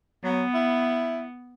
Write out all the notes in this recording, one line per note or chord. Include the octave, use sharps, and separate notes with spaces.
F#3 B3
E4